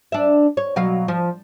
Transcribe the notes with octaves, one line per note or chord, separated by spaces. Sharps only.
D4 E5
C#5
B2 F#3 F5
F3